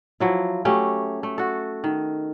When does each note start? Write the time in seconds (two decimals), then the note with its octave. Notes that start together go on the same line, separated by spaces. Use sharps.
0.20 F3 F#3 E4
0.65 F#3 A3 C#4 G4
1.23 A3
1.38 F#4 A4
1.84 D#3